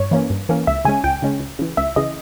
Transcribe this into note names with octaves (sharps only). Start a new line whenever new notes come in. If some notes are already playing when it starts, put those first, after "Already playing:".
Already playing: G2 C#5
E3 A#3 C#4
G2
E3 A#3 C#4
C#2 E5
C#3 G#3 C#4 G#5
C#2 G5
C#3 G#3 C#4
C#2
C#3 E3
C#2 E5
C#3 E3 D#5